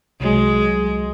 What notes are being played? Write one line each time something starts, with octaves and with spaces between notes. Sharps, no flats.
C2 F#3 G#3